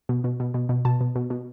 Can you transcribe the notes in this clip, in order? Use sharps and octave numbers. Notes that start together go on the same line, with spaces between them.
B2
B2
B2
B2
B2
B2 A5
B2
B2
B2